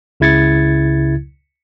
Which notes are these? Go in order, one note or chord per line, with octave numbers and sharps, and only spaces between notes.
C#2 C#3 E4 G#6 A6 C#7